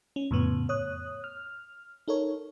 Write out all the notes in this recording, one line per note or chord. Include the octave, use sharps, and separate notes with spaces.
C#4
F2 A2 C#3 B3
C#5 D#6 F#6
F6
D#4 A4 A#4 C#5